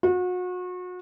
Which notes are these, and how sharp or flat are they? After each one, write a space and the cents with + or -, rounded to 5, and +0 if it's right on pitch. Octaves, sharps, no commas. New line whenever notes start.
F#4 -35